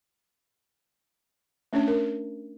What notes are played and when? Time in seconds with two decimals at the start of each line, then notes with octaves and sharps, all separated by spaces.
1.73 A3 C#4 D4 C#5
1.88 A#4